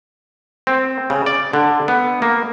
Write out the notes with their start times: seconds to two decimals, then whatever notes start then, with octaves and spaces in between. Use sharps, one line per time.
0.67 C4
1.10 C#3
1.26 D5
1.53 D3
1.88 B3
2.22 A#3